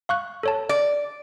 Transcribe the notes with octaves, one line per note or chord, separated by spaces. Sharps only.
F5 C#6 F#6
A4 C#5 A5
D5